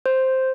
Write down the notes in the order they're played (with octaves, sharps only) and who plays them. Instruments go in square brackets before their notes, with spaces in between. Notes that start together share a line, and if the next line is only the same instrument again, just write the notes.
[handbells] C5